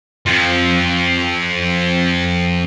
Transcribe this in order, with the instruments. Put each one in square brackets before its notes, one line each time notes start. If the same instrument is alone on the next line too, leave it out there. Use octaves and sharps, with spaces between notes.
[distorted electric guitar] F2 F3